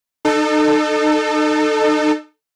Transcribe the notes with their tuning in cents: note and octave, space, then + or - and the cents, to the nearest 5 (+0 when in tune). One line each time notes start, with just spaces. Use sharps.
D#4 -35 A4 +5